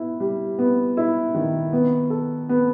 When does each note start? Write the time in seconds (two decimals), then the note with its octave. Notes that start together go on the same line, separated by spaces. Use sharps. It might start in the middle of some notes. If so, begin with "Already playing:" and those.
Already playing: B3 E4
0.20 G3
0.59 B3
0.97 E4
1.34 D#3
1.73 B3
2.10 A4
2.49 B3